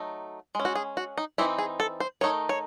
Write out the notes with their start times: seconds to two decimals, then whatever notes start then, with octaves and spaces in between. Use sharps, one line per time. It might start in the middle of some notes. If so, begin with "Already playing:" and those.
Already playing: F#3 A3 D#4
0.55 G#3 C#4
0.65 F#4
0.75 G#4
0.97 F#4
1.18 D#4
1.38 E3 C4 D#4 E4
1.58 G#4
1.80 A4
2.00 C5
2.21 D#3 A3 D#4 C#5
2.49 C#5